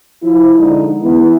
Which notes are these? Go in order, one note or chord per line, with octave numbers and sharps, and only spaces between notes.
F3 E4
D3 G#3 D#4
E3 B3 E4